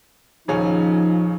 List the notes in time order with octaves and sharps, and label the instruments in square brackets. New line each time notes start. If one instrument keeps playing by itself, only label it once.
[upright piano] D#1 C#3 C#4 [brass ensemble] F3 D#4